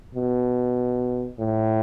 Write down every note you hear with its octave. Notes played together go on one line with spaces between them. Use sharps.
B2
A2